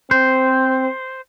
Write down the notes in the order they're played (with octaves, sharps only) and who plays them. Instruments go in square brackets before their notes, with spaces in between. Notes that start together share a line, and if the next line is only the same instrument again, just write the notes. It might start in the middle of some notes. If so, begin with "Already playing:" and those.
[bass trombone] C4 [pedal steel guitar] C5